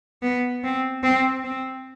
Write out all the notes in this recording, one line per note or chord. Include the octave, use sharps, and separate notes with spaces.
B3
C4
C4
C4